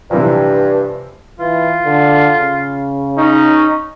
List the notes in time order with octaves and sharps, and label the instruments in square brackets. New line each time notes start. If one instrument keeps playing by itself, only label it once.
[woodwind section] G2 [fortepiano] C3 E3 F3
[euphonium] E3 [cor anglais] F4
[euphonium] D3
C#3
[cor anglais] C#4 [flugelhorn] D#4